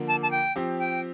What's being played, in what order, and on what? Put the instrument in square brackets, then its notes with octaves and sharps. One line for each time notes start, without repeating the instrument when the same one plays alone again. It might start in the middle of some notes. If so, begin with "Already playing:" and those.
Already playing: [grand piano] D3 F3 A#3
[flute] A5
A5
G5
[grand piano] F3 C4 G4
[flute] G5